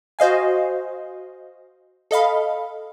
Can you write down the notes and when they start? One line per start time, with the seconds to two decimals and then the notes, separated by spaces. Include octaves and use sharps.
0.19 F#4 C5 D#5 F5 G#5
2.11 A4 D#5 F5 B5